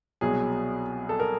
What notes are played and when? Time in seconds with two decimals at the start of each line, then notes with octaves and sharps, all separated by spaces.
0.21 C2 B2 F#3 G#4
1.09 A4
1.20 A#4